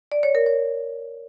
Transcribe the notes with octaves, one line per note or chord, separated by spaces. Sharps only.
D5
C#5
A#4
C#5